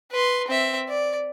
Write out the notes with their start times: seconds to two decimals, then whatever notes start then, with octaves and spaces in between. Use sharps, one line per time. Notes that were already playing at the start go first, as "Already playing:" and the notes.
0.12 B4 C6
0.48 C4 E5
0.89 D5